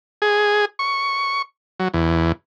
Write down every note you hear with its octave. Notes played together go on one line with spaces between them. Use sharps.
G#4
C#6
F#3
E2